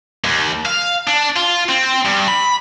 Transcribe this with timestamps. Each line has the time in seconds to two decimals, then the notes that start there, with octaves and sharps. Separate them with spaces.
0.24 D#2
0.66 F5
1.08 D4
1.37 F4
1.69 C4
2.06 G2
2.28 B5